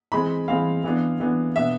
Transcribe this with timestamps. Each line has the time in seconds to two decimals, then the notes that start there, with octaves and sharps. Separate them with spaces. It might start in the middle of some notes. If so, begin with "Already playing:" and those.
0.12 E3 G#3 C4 B5
0.48 E3 G#3 C4 F5
0.84 E3 B3 D4
1.20 E3 B3 D4
1.56 B2 B3 D4 E5